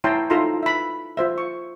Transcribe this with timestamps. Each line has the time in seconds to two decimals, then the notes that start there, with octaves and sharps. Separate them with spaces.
0.04 E4 C#5 G5 A5 A#5 C6
0.30 D#4 F4 A4 E5 A#5 C6
0.63 E5 B5
1.17 F4 C5 E5
1.38 C#6